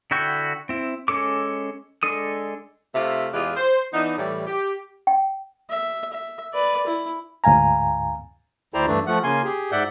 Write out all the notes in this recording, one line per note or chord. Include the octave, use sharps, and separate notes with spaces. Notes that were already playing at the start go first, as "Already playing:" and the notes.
D3 E4 F#4 G5 C#6
C4 E4
G#3 C#4 A4 D6
G#3 D4 A4 D#6
C3 A3 F4 G4 E5
E2 G#3 F4 G4 G#4 B4
C5
E3 B3 D4 D#4
A2 E3 G3
G4
G5
E5
E5
B4 D5
E4
D2 G#2 F5 G#5 A#5
D2 E4 C5 D5 G5 A#5
G2 E3 A3 D4
F3 A3 F#5
C#3 A#3 G#5 C6
G4 G#4
G#2 D5 E5 F#5 G6